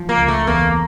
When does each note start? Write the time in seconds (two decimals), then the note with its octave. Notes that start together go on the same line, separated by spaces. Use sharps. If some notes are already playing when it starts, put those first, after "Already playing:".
Already playing: F3
0.09 A#3
0.18 C#2
0.28 A3
0.47 E2 A#3